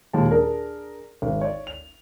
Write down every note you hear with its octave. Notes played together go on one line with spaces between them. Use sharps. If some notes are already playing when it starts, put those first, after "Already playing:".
D#2 A#2 G#3 A5
D4 G#4 A#4
G#1
C#5 D5
F7